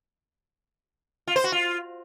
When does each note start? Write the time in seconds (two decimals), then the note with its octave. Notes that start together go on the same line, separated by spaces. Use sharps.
1.27 F4
1.36 C5
1.44 F#4
1.52 F4